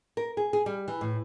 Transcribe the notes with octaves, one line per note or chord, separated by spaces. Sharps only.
A#4
G#4
G#4
G3
E3
A2